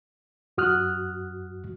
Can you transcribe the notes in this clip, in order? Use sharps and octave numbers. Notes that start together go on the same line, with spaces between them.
F#2 F#4 D#6 F6 F#6